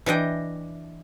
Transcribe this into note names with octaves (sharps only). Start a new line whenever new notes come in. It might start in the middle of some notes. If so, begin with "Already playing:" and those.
E3 D4 D#5 G5